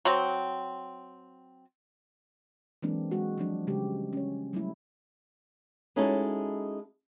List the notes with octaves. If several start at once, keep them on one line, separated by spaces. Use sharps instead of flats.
F#3 C4
E3 F#3 G#3 A#3 C4 D4
G#3 F#4
F3 F#3 D4
C#3 G3 G#3 G4
C#4 C#5
F#3 G3 A3 E4
G#3 C#4 D#4 E4 F#4 A4